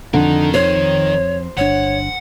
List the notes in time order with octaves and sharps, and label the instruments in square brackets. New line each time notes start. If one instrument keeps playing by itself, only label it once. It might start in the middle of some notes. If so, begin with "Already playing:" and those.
[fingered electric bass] F2 [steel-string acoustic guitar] D3 [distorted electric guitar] D#3 A#4
[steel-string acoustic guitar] C5 [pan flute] C#5
[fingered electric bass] G1 D4 [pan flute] C#5 [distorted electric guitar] F#5